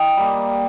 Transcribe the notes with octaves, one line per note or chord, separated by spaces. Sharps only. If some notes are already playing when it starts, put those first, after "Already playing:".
Already playing: D#5 G5
G3 A#3